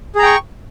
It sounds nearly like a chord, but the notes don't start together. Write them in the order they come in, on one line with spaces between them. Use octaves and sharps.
G#4 A#5 G5 C#6